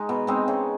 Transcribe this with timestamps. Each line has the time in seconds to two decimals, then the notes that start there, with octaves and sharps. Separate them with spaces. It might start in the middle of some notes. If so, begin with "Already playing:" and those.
Already playing: G#3 D#4
0.09 B2
0.27 G#3 C4 D#4
0.48 C#3